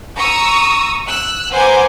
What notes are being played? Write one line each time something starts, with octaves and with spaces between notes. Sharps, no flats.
A#5 C#6 D#6 E6
E6 F#6
B4 C5 F#5 G#5 A#5 D6